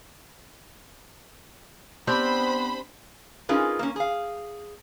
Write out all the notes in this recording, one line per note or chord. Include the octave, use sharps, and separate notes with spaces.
B3 C4 D4 G4 C5 B5
C#4 D#4 F4 G#4 A#4 B4
A#3 C#4
G#4 F5